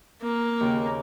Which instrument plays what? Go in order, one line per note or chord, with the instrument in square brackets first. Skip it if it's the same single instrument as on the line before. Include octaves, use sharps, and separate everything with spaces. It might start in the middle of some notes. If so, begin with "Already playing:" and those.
[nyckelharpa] A#3
[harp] D#2 C#3